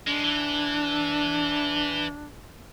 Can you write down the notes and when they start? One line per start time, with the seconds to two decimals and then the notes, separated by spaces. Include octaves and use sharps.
0.07 D#3 G#3 D4
0.23 E3